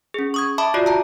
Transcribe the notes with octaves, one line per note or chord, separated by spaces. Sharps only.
C#4 G#4
C#6 D#6 G#6
E5 A5 B5 D6 D#6
F4 F#4 D5
A5 A#5